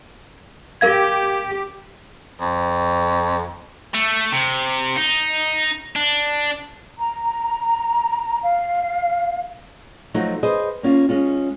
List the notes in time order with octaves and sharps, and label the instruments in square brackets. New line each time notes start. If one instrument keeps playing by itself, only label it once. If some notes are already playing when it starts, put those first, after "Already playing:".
[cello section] G4 [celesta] A#4 F5 G#6
[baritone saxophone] F2
[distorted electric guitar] A3
C3
D#4
D4
[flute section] A#5
F5
[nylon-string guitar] F3 F#3 A3 D#4 F4 F#4
G#4 B4 C5 D#5
A#3 C#4 F4
G#3 C#4 F4